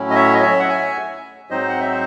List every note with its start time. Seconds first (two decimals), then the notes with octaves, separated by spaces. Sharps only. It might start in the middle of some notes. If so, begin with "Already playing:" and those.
Already playing: A2 F#3 C#4 E4
0.10 D#5
0.15 C#5 E5
0.34 D#5
0.42 C#5 E5
0.59 F#5
0.68 E5 G#5
1.50 G#2 F#3 C4 D#4 C5 D#5
1.69 F#5
1.80 E5
1.91 C5